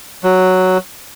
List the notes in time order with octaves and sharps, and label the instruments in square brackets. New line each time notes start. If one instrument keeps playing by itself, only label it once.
[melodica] F#3